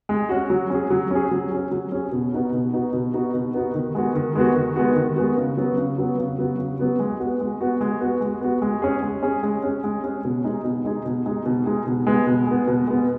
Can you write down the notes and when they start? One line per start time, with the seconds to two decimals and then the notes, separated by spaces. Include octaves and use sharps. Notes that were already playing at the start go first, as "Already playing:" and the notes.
0.09 G#3
0.29 C#4 F#4
0.50 F#3
0.70 C#4 G#4
0.90 F#3
1.11 C#4 G#4
1.31 F#3
1.51 C#4 G#4
1.71 F#3
1.92 C#4 G#4
2.12 B2
2.32 B3 D#4 F#4
2.52 B2
2.73 B3 D#4 F#4
2.93 B2
3.14 B3 D#4 F#4
3.34 B2
3.54 B3 D#4 F#4
3.75 D#3
3.95 G#3 B3 F#4
4.15 D#3
4.35 G#3 B3 F#4
4.56 D#3
4.76 G#3 B3 F#4
4.96 D#3
5.16 G#3 B3 F#4
5.37 C#3
5.57 F#3 B3 F#4
5.77 C#3
5.98 F#3 B3 F#4
6.19 C#3
6.38 F#3 B3 F#4
6.58 C#3
6.79 F#3 B3 F#4
7.00 G#3
7.20 B3 F#4
7.40 G#3
7.61 B3 F#4
7.81 G#3
8.01 B3 F#4
8.21 G#3
8.41 B3 F#4
8.62 G#3
8.82 C#4 G#4
9.03 G#3
9.23 C#4 G#4
9.43 G#3
9.63 C#4 G#4
9.84 G#3
10.04 C#4 G#4
10.25 B2
10.44 G#3 D#4 G#4
10.64 B2
10.85 G#3 D#4 G#4
11.05 B2
11.26 G#3 D#4 G#4
11.46 B2
11.66 G#3 D#4 G#4
11.87 B2
12.07 G#3 B3
12.27 B2
12.47 G#3 B3
12.67 B2
12.87 G#3 B3